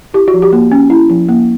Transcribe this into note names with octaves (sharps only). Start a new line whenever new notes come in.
E4 G4
F#4
F3
G4
A#3
C#4
E4
F3
A#3